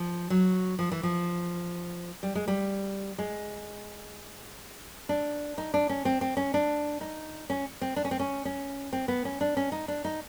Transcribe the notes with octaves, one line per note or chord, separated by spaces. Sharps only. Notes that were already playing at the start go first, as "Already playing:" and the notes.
Already playing: F3
F#3
F3
E3
F3
G3
G#3
G3
G#3
D4
D#4
D4
C#4
C4
C4
C#4
D4
D#4
C#4
C4
D4
C#4
C4
C#4
C#4
C4
B3
C#4
D4
C#4
D#4
D4
D#4